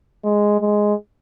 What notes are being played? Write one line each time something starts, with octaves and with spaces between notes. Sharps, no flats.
G#3
G#3